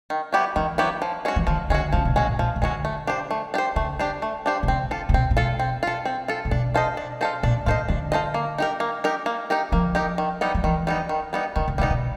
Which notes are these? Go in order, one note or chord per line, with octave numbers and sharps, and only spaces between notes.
D#3
F#3 B3 E4 G4
D#3 E3
F#3 B3 E4 G4
F3
G#3 C#4 F#4
E3
D#3 F3
D3 G#3 C#4 F#4
C#3 F3
B2
A#2 G#3 C#4 F#4
A2
A#2 F3
C#3
D3 G#3 C#4 F#4
A3
D4 G4 C5
A3
D4 G4 C5
C#3 A3
D4 G4 C5
A3
D4 G4 C5
B2
C3 C4
F4 A4
A#2
B2 C4
A#2
B2 F4 A4
C4
F4 A4
C4
F4 A4
A#2
B2 D4
F4 A4 C5 D#5
D4
F4 A4 C5 D#5
A#2 D4
A2 F4 A4 C5 D#5
D3 D4
F4 A4 C5 D#5
A#3
D#4 G4 A#4
A#3
D#4 G4 A#4
A#3
D#4 G4 A#4
F3 A#3
D#4 G4 A#4
D#3
G3 B3 D#4
F3
D#3 E3
G3 B3 D#4
D#3
G3 B3 D#4
D3 D#3
C#3
C3 G3 B3 D#4
B2